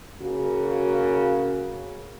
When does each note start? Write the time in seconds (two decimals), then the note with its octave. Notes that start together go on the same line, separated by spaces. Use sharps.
0.20 C#3 A#3 F#4